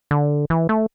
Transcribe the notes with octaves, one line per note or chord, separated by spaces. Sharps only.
D3
E3
A3